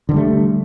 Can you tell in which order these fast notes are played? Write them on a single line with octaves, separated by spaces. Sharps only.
D3 D#3 G3 A3